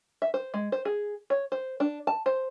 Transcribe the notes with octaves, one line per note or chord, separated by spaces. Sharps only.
E5
C5
G#3
C5
G#4
C#5
C5
D4
A5
C5